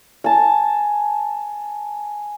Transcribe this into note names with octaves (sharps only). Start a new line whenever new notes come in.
G#5 A5